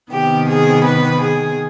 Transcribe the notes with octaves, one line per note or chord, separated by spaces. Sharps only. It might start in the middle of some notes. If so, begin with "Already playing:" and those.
C3 D#3 B3 G4
G#4
B4
G#4